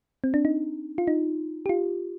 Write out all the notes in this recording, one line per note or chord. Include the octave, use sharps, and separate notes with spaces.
C4
D4
D#4
F4
D#4
G4
F4